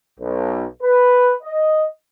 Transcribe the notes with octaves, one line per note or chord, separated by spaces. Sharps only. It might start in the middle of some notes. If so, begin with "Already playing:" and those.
B1
B4
D#5